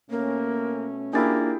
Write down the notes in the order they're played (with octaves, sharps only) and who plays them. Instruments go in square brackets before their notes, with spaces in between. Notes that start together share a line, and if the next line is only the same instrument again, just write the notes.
[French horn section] B2 A3 C#4 [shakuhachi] A#3
[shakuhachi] A#3 [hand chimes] D4 F4 A6 [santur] E4 G4 G#4